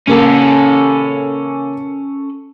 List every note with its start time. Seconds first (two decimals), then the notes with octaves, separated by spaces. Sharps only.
0.08 C#3 A#3 C#4 A4